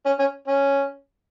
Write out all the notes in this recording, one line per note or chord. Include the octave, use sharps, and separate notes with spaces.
C#4
C#4
C#4